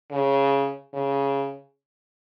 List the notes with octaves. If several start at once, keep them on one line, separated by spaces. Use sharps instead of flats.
C#3
C#3